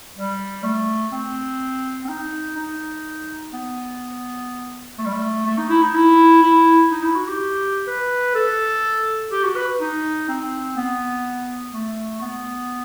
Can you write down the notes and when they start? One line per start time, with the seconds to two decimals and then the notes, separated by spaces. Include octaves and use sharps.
0.15 G3
0.64 A3
1.12 C4
2.05 C4
2.09 D#4
2.57 D#4
3.53 B3
4.98 A3
5.06 G3
5.13 A3
5.46 A3
5.58 D#4
5.70 E4
5.82 D#4
5.95 E4
6.43 E4
6.91 D#4
7.03 E4
7.15 F#4
7.27 G4
7.87 B4
8.35 A4
9.32 G4
9.44 F#4
9.56 B4
9.81 D#4
10.29 C4
10.77 B3
11.73 A3
12.21 B3